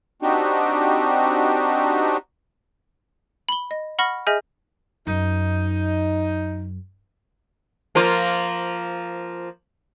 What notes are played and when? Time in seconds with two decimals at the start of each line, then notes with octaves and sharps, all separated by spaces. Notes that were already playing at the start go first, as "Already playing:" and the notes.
0.22 C4 D4 D#4 F#4 G4
3.49 B5 G7
3.71 D#5
3.99 F#5 B5 C#6 F6 A#6
4.27 G#4 D#5 E5 G#5 F6 G6
5.07 F#2 D#4
7.95 F3 A#3 F4